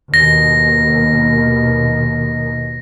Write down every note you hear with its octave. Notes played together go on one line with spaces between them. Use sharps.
D#2 B2 D#3 A#6